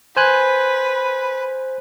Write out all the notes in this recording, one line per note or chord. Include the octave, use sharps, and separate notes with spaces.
B4 C5 G#5 F#6